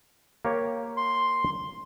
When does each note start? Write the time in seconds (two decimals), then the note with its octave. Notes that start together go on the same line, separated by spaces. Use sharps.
0.45 A#3 G4 C#5
0.97 C6